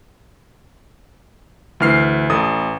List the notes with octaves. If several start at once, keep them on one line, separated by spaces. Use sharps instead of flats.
D2 E3 F6 C7
A1 A4 D#6